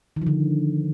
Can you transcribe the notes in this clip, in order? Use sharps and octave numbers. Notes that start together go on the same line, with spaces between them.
D#3
F3
D3